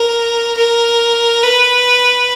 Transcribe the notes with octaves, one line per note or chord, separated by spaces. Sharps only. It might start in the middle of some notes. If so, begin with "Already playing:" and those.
Already playing: A#4
A#4
B4